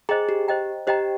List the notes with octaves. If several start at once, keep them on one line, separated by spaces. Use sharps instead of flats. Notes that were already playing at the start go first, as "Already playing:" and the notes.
G#4 C5 D#5 G5 A#5
G4
C5 D#5 G5 A#5
G4 C5 D#5 G5 A#5